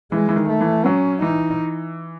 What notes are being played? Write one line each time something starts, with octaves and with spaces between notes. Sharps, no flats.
E3 G#3
E3
D#3
A3
E3
F#3 C#4
E3 D#4